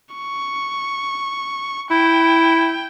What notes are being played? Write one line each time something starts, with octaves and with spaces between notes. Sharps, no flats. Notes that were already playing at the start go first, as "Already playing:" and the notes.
C#6
E4 G5